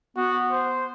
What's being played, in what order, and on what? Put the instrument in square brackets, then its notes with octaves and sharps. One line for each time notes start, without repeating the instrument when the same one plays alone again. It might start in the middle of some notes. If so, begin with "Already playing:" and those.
[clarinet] B3 [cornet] F#4
[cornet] C5